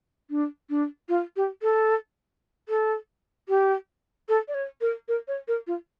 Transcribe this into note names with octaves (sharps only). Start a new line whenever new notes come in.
D4
D4
F4
G4
A4
A4
G4
A4
D5
C#5
A#4
A#4
C#5
A#4
F4